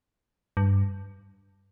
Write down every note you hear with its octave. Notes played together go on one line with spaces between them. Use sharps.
G2